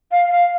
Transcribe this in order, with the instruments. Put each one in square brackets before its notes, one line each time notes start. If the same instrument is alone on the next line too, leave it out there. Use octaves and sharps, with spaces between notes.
[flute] F5
F5